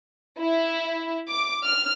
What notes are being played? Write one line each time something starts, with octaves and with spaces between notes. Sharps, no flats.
E4
D6
F6